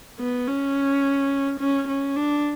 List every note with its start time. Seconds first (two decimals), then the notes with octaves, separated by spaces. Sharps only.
0.19 B3
0.47 C#4
1.60 C#4
1.88 C#4
2.16 D4